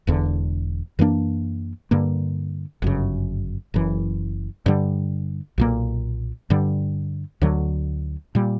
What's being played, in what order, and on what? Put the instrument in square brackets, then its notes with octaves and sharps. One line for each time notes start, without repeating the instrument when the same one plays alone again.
[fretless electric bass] E1 E2 D3
F#2 E3 A#3 D4
G2 D3 A#3
G1 F#2 C#3
F#1 F#2 E3
G2 D3 G3
B1 A#2 A#3
G2 D3 G3
D2 D3 F#3
A#2 G3